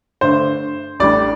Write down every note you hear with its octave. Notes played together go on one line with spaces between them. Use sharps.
G2 D3 A3 D4 C5
A1 A2 G3 D4 D5